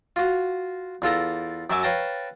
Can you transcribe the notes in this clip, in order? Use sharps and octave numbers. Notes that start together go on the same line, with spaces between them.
F4 F#4
E2 F4 A4 A#5
F#2 F#3 F#4 E5 G#5 D6
B4 C#5 F5 G5 A5 A#5